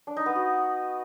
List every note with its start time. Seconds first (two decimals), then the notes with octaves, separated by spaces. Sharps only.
0.07 D4
0.17 D#4
0.26 B3
0.36 F#4